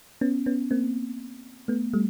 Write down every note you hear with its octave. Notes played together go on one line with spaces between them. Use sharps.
B3 C#4
B3 C#4
A#3 C4
A3 B3
G3 A3